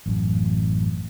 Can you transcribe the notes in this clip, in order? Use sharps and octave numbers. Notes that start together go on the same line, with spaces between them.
A1 F#2